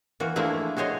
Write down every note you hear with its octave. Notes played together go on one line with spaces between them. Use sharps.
E3 A#3 F#4
F3 A3 A#3 D4 E4 G#4
F#4 G#4 C5 C#5 D#5